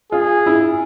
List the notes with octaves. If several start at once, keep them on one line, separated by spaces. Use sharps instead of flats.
F4 G#4
E4